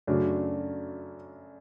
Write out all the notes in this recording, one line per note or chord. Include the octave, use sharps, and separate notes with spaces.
F#2 C#3 F#3 A3 D4